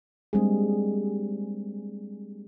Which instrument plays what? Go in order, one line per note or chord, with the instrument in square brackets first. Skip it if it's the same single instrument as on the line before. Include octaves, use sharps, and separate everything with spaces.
[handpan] G3 G#3 A#3 C4 D4 G#4